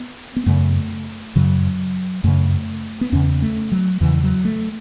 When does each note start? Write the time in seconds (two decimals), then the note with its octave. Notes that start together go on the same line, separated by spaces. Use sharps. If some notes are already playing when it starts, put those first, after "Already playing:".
Already playing: B3
0.36 B3
0.46 F#2 C#3 A3
1.36 F#2 C#3 F#3
2.24 F#2 C#3 A3
3.01 B3
3.12 E2 C#3 C#4
3.42 A3
3.72 F#3
4.01 E2 C#3 E3
4.24 F#3
4.45 A3